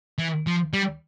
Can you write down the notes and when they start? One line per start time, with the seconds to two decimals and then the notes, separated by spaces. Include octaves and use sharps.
0.18 E3
0.47 F3
0.73 G3